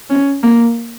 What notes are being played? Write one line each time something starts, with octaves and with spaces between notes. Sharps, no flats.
C#4
A#3